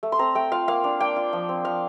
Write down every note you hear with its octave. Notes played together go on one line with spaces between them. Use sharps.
A3
C6
C4 A#5
A3 G5
F4 F5
A#3 F5
D4
A#3 G5
F4
F3
C4
F3 F5